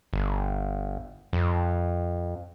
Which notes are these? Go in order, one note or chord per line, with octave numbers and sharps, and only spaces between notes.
G1
F2